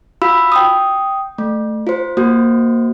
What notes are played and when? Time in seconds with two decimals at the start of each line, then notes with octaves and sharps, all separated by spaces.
0.22 F4 F#4 F5 B5 E6
0.52 G5 D#6
1.38 A3
1.87 F4 C5
2.17 A#3 F#4 C5